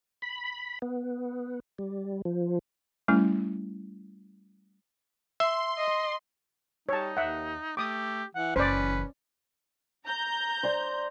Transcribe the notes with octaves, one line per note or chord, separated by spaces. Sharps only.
B5
B3
G3
F3
G3 A3 C#4 E4
E5 C6
D#5
G3 D#4 C#5 A5
D#2 E5 F#5
A3 G4 D6 D#6
E3 F#5
F#1 E3 C#4 B4 C5 D5
A#5 G6
C5 D5 C6